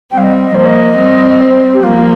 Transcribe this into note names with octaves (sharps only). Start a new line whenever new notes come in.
G3 C4 G5
F5
D#5
D#5
F3 A#3 C5
D#5
G3 C4
D#5
C5
G4
F3 A#3 F4